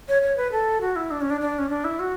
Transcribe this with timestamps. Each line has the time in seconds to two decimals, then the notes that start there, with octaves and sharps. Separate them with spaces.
0.09 C#5
0.22 C#5
0.37 B4
0.52 A4
0.81 F#4
0.96 E4
1.11 D4
1.21 C#4
1.30 D4
1.41 D4
1.59 C#4
1.70 D4
1.84 E4
2.00 F#4